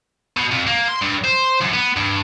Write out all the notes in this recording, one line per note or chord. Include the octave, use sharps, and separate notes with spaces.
B2
F2
A#3
C6
G2
C5
F#2
B3
G2